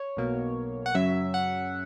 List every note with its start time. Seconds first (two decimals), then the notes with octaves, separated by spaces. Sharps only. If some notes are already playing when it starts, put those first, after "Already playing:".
Already playing: C#5
0.17 B1 B2 A#3
0.86 F#5
0.94 F#2 C#3 F#3 C#4 E5
1.34 F#5